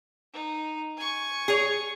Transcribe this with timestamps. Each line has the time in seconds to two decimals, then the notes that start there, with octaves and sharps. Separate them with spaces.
0.34 D#4
0.97 G#5 C#6
1.48 G#4 C#5